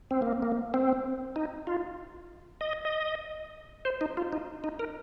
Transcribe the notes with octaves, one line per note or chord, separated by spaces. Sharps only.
C4
A#3
A#3
C4
D#4
F4
D#5
D#5
C5
D#4
F4
D#4
D#4
A#4